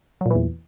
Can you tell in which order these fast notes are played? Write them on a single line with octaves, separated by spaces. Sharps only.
F#3 A#2 E3 E2